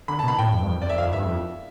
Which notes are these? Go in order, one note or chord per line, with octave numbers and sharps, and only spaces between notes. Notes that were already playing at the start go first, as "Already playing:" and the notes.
D3 B5
A5
B2
B5
A2 G5
F2
G2
F2
F2 D5
E5
F2 F5
G2 E5
F2